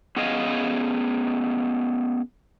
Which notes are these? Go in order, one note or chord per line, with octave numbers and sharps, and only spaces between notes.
B3 C#4 G#4 D#5 F5